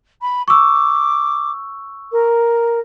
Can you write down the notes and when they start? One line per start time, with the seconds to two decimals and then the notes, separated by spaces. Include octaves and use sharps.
0.21 B5
0.48 C#6 D6 E6
2.12 A#4